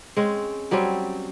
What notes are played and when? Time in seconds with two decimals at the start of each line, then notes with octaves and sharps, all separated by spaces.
0.17 G#3 C4 C#4
0.71 F#3 G3 C4 C#4